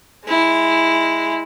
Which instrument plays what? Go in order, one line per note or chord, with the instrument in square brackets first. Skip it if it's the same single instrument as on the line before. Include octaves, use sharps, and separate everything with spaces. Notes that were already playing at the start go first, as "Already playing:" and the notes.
[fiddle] G#3 E4